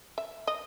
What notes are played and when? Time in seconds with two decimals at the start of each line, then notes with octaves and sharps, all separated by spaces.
0.18 E5
0.47 D#5